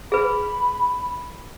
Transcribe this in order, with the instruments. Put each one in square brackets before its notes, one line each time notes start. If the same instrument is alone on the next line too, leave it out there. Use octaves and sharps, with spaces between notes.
[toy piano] G#4 B4 [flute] B5